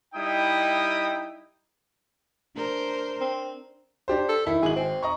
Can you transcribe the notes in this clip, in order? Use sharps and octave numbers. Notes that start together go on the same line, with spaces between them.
G3 D#4 E4 D#5 G5 D#6
D4 A#4 C5
C4
D4 G4 C5
A4
D#3 E4
G#1 G#4 F#7
C4
D#5 A#5 C#6